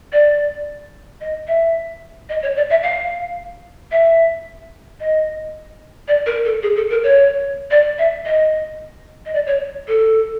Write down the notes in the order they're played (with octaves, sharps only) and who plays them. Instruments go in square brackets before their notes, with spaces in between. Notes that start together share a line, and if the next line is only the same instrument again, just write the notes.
[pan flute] D5
D#5
E5
D#5
C#5
D5
E5
F5
E5
D#5
D5
A#4
A4
G#4
A4
A#4
C#5
D5
E5
D#5
D#5
D5
C#5
A4